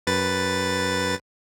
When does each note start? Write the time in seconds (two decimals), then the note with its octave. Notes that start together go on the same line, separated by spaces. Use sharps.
0.07 F#2 B4 A6